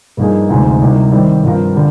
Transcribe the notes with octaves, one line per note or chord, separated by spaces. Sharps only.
G2 F3 A#3 D#4 G#4
D2 C3 F3 G#3 D#4
C2 C3 F3 A#3 D#4
D#3 G3 C4
G2 F3 C4 F4 A#4
D3 G3